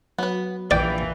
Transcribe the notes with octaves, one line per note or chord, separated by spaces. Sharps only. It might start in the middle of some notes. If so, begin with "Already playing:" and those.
F#3 B3 B4
A#1 E3 A#3 D5 G5